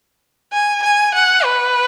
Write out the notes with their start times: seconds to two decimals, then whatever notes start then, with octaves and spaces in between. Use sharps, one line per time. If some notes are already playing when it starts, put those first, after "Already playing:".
0.52 G#5
0.83 G#5
1.14 F#5
1.45 B4